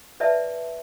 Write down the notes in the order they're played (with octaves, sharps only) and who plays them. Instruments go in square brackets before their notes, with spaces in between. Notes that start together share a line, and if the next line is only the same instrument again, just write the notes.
[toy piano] B4 D5 E5 A5